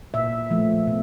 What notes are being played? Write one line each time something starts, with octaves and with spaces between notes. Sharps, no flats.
A#2 E5
F3 A3
B2